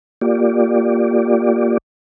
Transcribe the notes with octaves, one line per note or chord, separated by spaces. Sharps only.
A#3 F4 G4 D5